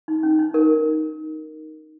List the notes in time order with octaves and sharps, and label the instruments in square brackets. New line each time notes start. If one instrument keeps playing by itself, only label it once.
[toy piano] D#4
C#4
D#4
A#4